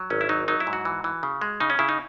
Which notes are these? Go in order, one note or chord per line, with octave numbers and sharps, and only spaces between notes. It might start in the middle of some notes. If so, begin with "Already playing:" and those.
Already playing: F#3
G#1 C#4
E4
F#3 D#4
F#3 D#4
E4
G#2
F#4
E3
E3
C#3
G#3
C#3 D#4
C#4
C#3 E4
D#4